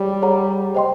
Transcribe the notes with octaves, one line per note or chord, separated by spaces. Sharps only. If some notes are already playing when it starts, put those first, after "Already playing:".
Already playing: G3 G#4 C#5
G#4 C#5 F#5 A#5
C5 D#5 G5 C6